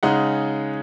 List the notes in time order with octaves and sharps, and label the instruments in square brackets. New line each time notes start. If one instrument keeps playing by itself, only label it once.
[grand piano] C#3 G#3 D#4 F#5